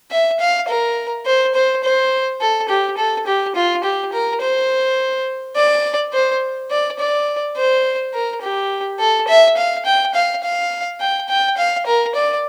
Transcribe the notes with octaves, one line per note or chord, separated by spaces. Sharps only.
E5
F5
A#4
C5
C5
C5
A4
G4
A4
G4
F4
G4
A#4
C5
D5
C5
D5
D5
C5
A#4
G4
A4
E5
F5
G5
F5
F5
G5
G5
F5
A#4
D5